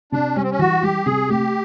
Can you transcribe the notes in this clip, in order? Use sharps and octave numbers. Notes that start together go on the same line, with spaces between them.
C3 D4
G3 C#4
C4
C#4
E3 F#4
G3 G4
C3 G#4
A3 G4